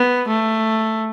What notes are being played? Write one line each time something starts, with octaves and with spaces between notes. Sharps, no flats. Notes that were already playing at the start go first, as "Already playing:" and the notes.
Already playing: B3
A3